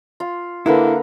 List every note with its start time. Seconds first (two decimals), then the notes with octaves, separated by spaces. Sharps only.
0.20 F4
0.66 D3 A#3 E4 A#4 B4 F#5